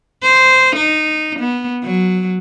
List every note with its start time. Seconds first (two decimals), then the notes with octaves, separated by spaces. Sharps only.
0.23 C5
0.76 D#4
1.39 B3
1.83 F#3